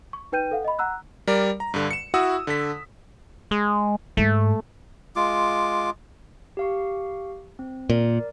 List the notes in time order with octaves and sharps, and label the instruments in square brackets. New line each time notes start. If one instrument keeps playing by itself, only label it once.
[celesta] C#6
D#4 B4 G5 G6 D#7
A4 F5 F#5
D#5 B5
F#5 A#5 E6 F#6
[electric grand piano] G3 A#4 D5
A#5
G2 D3
C#7 E7
E4 F#4 F#5 D#6 E6
D3 A4 B6
[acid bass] G#3
[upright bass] G#2 [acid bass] A3
[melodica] G#3 F4 D6
[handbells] G4 F5 C#6
C4
[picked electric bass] A#2 [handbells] A#4 D5